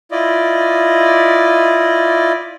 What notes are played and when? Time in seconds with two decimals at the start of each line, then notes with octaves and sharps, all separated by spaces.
0.11 E4 F4 D5 D#5